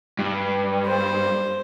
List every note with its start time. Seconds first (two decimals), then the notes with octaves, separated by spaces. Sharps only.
0.19 G2
0.87 C5